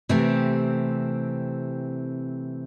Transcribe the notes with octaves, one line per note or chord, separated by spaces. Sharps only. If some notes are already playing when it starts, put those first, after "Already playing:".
C3 E3 A3 C4 G4